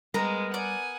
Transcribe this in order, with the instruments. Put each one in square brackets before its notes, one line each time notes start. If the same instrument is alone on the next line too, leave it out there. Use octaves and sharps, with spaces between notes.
[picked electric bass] G3 [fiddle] G#3 [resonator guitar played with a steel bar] B3 A#4 [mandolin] A#5
[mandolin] D5 [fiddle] F#5 G#5